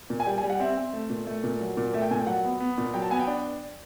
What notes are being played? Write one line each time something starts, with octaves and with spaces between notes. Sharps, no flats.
A#2
G#5
G3 G5
G#5
G3
F#5
C4 E5
C4
A3
A#2
A3
A#2
F#3
A#2
A3 E5
G5
A#2 G#5
G5
F#3 F#5
B3
B3
A#2
F#3 G5
A5
B3 G#5
G5
D4